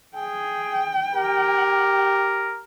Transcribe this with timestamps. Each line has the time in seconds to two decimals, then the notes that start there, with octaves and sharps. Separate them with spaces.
0.15 G#4 G5
1.15 G4 A#4